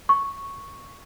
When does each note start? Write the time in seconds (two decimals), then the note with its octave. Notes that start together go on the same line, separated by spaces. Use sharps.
0.09 C#6